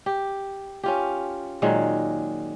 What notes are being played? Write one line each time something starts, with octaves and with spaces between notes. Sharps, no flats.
G4
C#4 F4 G4
A#2 D#3 F#3 G#3